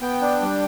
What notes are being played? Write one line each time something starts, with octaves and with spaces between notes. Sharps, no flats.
B3 G5
D4
G3